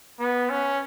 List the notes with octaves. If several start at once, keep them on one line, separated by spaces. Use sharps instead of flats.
B3
C#4